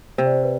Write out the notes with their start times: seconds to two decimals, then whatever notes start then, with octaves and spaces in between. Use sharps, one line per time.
0.18 C3 C5
0.26 D5
0.33 C5
0.43 B4